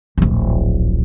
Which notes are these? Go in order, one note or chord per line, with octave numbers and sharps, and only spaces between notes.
D1 A#1